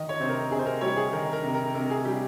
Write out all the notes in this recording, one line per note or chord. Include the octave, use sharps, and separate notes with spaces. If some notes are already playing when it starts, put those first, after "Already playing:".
Already playing: D#3 D#5
C#5
C3 C5
A#4
C3 G#4
C5
A#4
G3 C#5
G#4
D#3 A#4
A#4
C3
A#4
C3 A#4
G#4
G3 G4